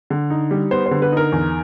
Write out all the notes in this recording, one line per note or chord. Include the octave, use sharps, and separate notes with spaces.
D3
D#4
G3
B3 C5
C5
D3
B4
D#4 A#4
E2